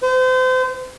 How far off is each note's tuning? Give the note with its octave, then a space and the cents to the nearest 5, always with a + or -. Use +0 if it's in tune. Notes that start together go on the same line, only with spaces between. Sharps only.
C5 -35